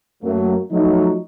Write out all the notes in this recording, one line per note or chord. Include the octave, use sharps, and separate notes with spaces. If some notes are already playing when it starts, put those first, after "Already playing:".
F#2 F#3 A3 A#3
F3 F#3 A3 D#4